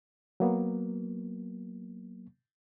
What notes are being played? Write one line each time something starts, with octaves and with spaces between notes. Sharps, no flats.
F#3 A#3 B3